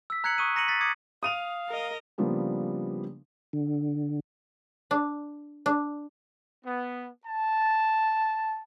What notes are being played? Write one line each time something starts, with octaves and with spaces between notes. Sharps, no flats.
E6 B6
A#5 F#6 G#6 B6 C#7 F#7
C#6 D#6 D#7
A#5 A#6 C#7 D#7 F#7
A6 B6
D6 D#6 G#6 C#7
F5 D#6 D#7 F7
A#4 D#5
C#3 F3 G3 A#3 B3 D4
D3
D4
D4
B3
A5